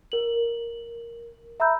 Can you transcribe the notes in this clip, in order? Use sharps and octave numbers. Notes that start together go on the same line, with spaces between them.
A#4 F#7
E5 A#5 B5 E6 G6